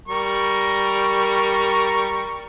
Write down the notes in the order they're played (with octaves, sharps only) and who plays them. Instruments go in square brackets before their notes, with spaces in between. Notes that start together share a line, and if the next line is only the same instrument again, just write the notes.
[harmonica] G3 A#4 C#6